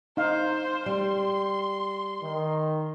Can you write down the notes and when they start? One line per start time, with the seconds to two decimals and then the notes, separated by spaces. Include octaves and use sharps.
0.17 D#4 C5 F5
0.86 G3 C6
2.23 D#3